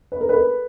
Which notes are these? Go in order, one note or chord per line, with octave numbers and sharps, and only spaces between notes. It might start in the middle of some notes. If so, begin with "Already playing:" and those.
B4
A#4
A4 B4